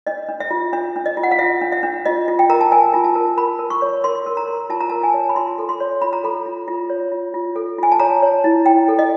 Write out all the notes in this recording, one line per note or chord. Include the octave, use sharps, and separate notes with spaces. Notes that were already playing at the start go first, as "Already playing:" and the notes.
D4 D#5
D4
E5
F4
D4 E5
D4
D#5
F4
F#5
F5
F4 E5
D4
E5
D4
F4 D#5
F4
G5
A#4 A#5
A5
A#4 G#5
F4
A5
A#4
A#4 B5
A#4
C#6
C#5
A#4 C6
A#4
A#5
A#4
F4 A5
A#5
A#4 A5
G#5
C#5
B5
F4 C6
A4
C6
C#5
F4 B5
A#5
A4 B5
F4
F4
C#5
F4
F4
A4
F4 G#5
A5
C#5 A#5
C#5
E4
E4 G5
A4
D#5